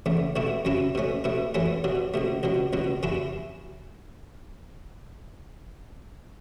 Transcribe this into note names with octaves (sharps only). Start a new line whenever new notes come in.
E2 C#3 A3
B1 B2 A3 E4
F#2 C#3 F#3 C#4 E4
B2 A3 C#4
B2 A3 E4
F#2 E3 A3 C#4 E4
B1 B2 F#3
C#2 B2 A3
C#2 B2 F#3
C#2 B2 F#3
F#2 C#3 F#3 C#4 E4